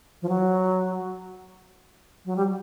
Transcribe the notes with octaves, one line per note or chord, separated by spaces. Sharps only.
F3
F#3
F#3
G3